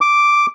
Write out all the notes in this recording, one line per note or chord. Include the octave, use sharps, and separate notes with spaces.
D6